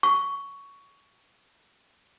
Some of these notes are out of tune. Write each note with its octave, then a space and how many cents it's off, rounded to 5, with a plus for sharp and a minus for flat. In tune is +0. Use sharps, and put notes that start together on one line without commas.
C#6 +10